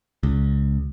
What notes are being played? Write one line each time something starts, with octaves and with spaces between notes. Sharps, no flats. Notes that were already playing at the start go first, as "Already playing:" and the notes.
C#2